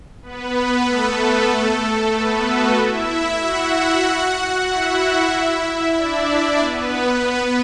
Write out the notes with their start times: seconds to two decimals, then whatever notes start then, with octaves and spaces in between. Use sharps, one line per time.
0.23 B3 B4
0.86 A3 A4
2.14 B3 B4
2.46 F#4
2.77 E4 E5
3.40 F#4 F#5
4.68 E4 E5
5.95 D4 D5
6.26 D4 D5
6.59 B3 B4